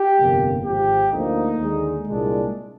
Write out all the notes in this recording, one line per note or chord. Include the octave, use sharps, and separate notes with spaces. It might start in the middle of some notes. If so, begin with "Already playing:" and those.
Already playing: G4
G1 F2 C3 G3 A#3
G#1 G#2 F3 G4
D2 D3 F3 A#3 D#4
D#2 D3 G#3
C2 A#2 G#3 D4